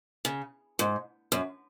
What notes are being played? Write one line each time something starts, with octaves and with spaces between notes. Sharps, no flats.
C#3
G#2
F#2